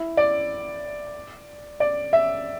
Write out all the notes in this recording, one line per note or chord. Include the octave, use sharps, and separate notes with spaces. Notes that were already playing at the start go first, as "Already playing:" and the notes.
Already playing: E4
D5
D5
E5